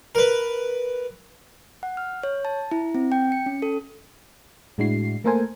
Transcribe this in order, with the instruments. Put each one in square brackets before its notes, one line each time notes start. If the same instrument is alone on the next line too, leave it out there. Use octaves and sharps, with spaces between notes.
[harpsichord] A#4 B4
[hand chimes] F#5
F6
C#5
A5
E4
C4
G5
C#7
C#4
A4
[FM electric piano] A2 G#3 D4 E4 F#4 C7
A3 A#3 A4 A#4 C5 G#5